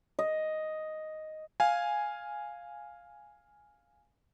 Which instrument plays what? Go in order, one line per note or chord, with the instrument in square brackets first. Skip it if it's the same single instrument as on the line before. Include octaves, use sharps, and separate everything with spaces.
[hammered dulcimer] D#5
[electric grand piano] F5 G#5